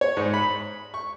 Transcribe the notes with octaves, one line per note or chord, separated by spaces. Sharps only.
C#5
G#2
B5
C#6